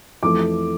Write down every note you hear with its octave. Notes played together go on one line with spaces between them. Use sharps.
F2 E3 A3 D6